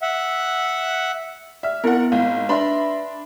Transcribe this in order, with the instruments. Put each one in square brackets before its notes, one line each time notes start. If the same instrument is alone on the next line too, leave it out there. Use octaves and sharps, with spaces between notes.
[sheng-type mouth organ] E5 F#5
[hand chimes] D5 F6 [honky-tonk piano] E5
[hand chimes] B3 C4 E4 [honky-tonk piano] A#4 F#5
[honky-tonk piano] G#1 [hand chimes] F5
[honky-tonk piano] D4 B5 C6 [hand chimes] B4 E5